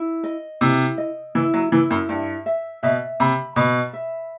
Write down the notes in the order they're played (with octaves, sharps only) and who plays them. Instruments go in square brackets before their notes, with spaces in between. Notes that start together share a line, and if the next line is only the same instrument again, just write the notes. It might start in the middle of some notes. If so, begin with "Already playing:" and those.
Already playing: [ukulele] E4
D#5
[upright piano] C3 [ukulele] E4
[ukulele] D#5
[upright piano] E3 [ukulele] E4
[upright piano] F#3
[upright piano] E3 [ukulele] E4
[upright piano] F#2
[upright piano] G2 [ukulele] E5
[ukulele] E5
[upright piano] B2 [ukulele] E5
[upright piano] C3 [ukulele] B5
[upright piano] B2 [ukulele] B5
[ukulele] E5